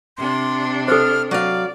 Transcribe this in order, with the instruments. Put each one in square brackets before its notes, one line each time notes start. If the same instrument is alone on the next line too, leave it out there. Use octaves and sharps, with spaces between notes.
[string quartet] C3 D4 [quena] C6
[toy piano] A4 C5 [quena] F6
[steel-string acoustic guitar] F#3 F5 [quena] D5